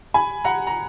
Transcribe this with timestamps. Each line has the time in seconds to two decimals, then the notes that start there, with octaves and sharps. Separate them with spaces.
0.14 G#5 B5
0.44 F#5 A#5
0.67 A#5